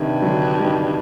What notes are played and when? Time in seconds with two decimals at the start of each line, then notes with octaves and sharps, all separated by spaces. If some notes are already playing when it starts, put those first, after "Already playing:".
Already playing: G2 C3 D#3
0.22 D3 F#3
0.59 D#3 G3